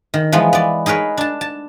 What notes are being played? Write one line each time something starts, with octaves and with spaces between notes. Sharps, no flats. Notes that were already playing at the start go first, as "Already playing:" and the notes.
D#3
E3 F3 G#3 B3
B3 D5
D#4 G#4 A#4 B4 C#5
D4 A5
A5